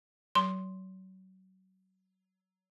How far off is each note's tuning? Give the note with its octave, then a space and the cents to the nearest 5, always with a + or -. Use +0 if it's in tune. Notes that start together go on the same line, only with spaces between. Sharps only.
F#3 +30 C6 +0